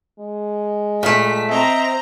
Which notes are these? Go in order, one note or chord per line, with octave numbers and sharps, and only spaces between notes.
G#3
A#2 A3 B6
C4 C5 D#5 E5 A#5